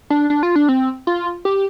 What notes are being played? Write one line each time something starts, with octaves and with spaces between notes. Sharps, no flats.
D4
D4
F4
D4
C4
F4
G4